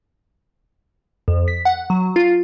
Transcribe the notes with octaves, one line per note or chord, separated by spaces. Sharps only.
F2
B6
F#5
F#3
F4